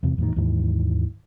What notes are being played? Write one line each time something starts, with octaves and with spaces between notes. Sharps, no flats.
E2 C3
E2 A2 D#3
D#2 G#2 D#3 E3